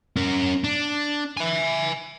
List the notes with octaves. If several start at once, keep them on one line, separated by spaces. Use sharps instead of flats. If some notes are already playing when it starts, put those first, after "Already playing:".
C#4 A#4
D4
E5 G#5